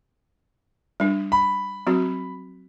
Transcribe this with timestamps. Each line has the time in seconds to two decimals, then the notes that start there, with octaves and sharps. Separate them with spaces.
1.00 G3 D4
1.32 B5
1.87 F#3 C4 F#4